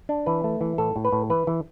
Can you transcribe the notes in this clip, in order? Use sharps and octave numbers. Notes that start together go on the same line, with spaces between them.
D4
E3 B4
A3
E3
A2 A4
A2
B4
A2
E3 B4
E3